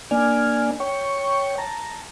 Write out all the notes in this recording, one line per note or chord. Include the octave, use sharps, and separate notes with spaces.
A#3 D4 D5 G#5 F6
C#5 G5 C#6
A5 A#5